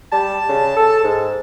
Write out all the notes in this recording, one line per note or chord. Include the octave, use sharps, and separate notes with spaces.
G3 A5
C#3
A4
G#2